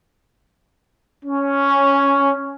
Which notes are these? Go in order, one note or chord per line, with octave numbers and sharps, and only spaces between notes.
C#4